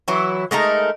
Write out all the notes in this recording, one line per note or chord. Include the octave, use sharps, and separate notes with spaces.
E3 F#3 E4
G#3 A3 D#4 A#4